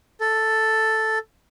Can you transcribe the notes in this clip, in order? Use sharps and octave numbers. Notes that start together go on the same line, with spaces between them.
A4